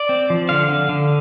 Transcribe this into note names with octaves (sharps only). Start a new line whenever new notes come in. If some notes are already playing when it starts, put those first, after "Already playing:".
Already playing: D5
C4
F3
D3 F5
D3
D3